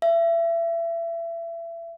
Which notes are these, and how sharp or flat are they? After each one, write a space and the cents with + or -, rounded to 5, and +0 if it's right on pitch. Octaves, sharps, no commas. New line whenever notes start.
E5 +30